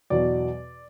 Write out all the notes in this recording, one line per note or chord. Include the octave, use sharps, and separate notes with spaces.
E2 B2 F#3 D5